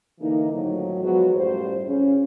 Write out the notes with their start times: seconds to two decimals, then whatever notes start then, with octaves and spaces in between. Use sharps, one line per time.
0.20 D3 E3 A#3 D#4
0.51 F2 A2 D#3 F3 F#3
1.02 F3 F#3 G#3 B3 F#4 G#4
1.34 F#2 A2 G3 F4 C5
1.86 C#3 C#4